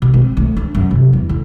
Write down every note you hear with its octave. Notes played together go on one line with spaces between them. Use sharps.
B2
C4
D2
D4
F#2
C3
E2
D3